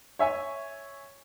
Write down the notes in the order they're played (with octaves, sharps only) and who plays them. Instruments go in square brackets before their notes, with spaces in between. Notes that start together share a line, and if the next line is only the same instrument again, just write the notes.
[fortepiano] C#5 E5 G#5 C#6